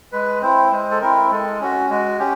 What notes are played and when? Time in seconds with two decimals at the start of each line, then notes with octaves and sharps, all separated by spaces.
0.12 G#3 B4
0.42 C4 E4 C5
0.72 G#3 C5
0.91 A4
1.01 C4 E4 A#4
1.31 G#3 A4
1.61 C#4 F#4
1.90 G#3 F#4
2.19 C#4 G4